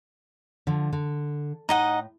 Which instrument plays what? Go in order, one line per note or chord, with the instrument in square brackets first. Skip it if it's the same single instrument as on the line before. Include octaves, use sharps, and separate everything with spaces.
[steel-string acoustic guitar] D3 F3
D3
[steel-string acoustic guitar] A2 [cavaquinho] D#4 D#5 F#5